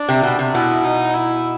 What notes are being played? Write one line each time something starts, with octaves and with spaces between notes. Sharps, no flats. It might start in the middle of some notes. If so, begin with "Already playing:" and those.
Already playing: D4
C3
B2
C3
B2 E4
D#4
E4